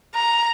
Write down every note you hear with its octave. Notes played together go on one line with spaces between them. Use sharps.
A#5